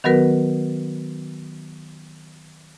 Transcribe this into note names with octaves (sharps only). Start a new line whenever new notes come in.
D#3 F#3 B3 F#4 A#4 B4